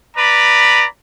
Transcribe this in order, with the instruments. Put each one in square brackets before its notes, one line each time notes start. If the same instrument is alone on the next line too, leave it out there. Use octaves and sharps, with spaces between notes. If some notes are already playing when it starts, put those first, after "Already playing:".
[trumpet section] B4 D5 A#5 B5